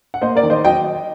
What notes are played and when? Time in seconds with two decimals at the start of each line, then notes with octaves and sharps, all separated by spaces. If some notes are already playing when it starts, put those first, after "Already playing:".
0.14 F#5
0.22 A#3 C5 D#5
0.36 A#4 D5
0.43 D#3
0.50 C5 D#5
0.65 F#3 D#5 G5